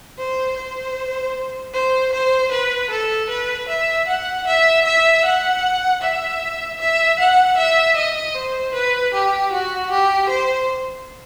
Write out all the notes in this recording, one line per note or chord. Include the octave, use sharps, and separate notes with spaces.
C5
C5
C5
C5
B4
A4
B4
E5
F#5
E5
E5
F#5
E5
E5
F#5
E5
D#5
C5
B4
G4
F#4
G4
C5